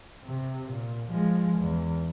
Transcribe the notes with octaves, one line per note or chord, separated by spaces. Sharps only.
C3
A#2
F3 G#3
E2